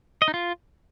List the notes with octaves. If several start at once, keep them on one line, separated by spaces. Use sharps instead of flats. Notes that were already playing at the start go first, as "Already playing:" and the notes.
D#5
D#4
F4